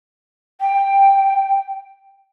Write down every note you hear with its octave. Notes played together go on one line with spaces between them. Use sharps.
G5